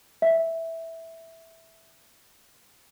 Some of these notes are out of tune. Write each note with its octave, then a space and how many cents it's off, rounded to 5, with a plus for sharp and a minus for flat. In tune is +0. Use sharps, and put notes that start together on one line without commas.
E5 -5